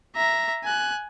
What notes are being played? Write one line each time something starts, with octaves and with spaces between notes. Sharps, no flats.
E5 A#5
G#5 F#6